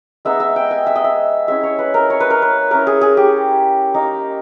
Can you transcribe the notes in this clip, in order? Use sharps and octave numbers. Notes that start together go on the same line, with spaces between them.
G#3 B3 D#4 E5
E5
G5
G#5
E5
D#5
E5
G#3 C#4 E4 E5
C#5
B4
A#4
C#5
B4
A#4
B4
A#3 C#4 E4 A#4
G#4
G#4
G4
A#3 D#4